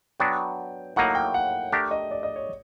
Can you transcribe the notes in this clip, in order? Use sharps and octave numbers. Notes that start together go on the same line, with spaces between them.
F#3 B3 D4 F#4 G5
A2 F#3 A#3 D#4 F#5
G5
F#5
A3 D4 G4 A#4
D#5
D5
D#5
C#5